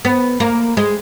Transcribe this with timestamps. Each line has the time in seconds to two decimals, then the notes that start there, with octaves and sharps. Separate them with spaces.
0.05 B3
0.40 A#3
0.77 G#3